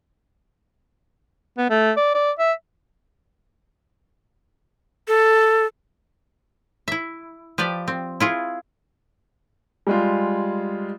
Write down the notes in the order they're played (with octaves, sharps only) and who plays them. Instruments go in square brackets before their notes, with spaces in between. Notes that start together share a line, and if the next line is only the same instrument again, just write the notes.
[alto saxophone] B3
A3
D5
D5
E5
[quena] A4
[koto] E4 E5
F3 G4 B4 D5
C4
E4 F4 G#4
[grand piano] G3 G#3 F4